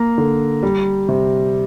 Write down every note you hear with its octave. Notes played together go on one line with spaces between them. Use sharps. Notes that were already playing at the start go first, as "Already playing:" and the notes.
Already playing: A#3 A#5
D3
G3
C3